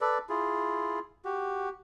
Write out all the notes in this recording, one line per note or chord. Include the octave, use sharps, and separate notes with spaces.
A4 B4 D5
E4 F4 G#4
F#4 G4